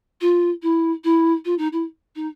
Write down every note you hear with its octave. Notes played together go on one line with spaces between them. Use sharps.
F4
E4
E4
F4
D#4
E4
D#4